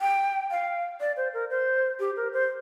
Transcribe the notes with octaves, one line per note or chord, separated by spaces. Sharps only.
G5
F5
D5
C5
A#4
C5
G4
A#4
C5